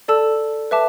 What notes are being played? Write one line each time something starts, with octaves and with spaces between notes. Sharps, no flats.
A4 D5 A5 E6
B4 E5 A5 D6